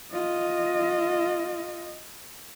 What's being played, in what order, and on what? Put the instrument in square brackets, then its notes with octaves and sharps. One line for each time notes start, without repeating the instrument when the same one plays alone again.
[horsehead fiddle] F4 D#5